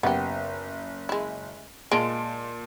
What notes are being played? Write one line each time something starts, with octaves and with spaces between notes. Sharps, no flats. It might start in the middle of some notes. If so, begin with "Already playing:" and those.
F#1 B3 G4
G#3 E4
A#2 G#3 F4 A5 D7